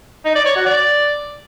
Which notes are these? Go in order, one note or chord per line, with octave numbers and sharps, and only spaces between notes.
D#4
D5
C#5
F#4
D5